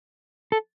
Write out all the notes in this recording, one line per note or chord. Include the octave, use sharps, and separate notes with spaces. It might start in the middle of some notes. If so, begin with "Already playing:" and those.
A4